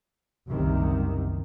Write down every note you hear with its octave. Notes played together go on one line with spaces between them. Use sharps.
F#1 C2 C3 D#3